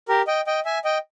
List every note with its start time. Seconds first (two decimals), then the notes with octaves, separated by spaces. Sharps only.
0.08 G4 A#4
0.27 D#5 G5
0.47 D#5 G5
0.65 E5 G#5
0.85 D#5 G5